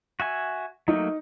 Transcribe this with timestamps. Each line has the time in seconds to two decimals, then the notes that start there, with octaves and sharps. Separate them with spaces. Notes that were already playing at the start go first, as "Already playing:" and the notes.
0.20 F#4 E5 G#5
0.88 F#3 A3 A#3 D#4